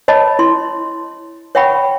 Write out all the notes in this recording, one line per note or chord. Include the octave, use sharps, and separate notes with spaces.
C#5 D#5 A5 B5
E4 C6
C#5 E5 F#5 G5 B5 C#6